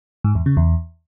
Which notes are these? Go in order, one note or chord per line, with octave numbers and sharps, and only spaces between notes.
G#2
E2
C#3
E2